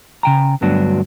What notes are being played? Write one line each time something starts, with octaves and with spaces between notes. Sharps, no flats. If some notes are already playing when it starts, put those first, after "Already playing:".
C#3 G5 A#5
D2 G2 F#3 B3 D4 F#4